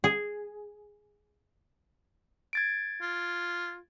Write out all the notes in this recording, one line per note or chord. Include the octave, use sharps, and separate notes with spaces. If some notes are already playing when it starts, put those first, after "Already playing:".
G#4
G#6 A6 D7
F4